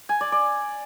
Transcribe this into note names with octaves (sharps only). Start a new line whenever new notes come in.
G#5
D5
D5